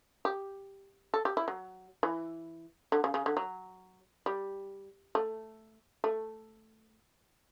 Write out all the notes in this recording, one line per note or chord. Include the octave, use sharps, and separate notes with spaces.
G4
A4
G4
E4
F#3
E3
D3
C#3
C#3
D3
F#3
G3
A3
A3